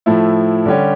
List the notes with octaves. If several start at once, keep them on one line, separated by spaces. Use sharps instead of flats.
A2 F3 A3 E4
D3 G3 C#4 G4